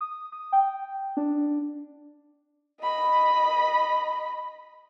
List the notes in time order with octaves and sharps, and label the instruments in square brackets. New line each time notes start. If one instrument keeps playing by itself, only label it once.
[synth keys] D#6
D#6
G5
D4
[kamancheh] D#5 B5